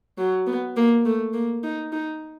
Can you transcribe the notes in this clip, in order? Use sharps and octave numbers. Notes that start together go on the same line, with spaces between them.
F#3
B3
A#3
A3
A#3
D#4
D#4